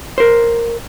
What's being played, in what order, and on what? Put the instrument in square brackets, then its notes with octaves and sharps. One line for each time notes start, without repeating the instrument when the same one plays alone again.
[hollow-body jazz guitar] A#4 C5